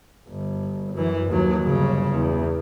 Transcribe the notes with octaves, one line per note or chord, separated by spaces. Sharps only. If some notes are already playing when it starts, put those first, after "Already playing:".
G1
F#2 E3
D#2 F#3
G1 C#3
E2